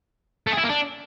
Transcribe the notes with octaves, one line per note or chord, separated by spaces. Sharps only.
A3
G#4
E4
A#3
D4